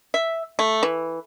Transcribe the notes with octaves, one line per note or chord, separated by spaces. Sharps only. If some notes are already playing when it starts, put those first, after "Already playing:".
E5
A3
E3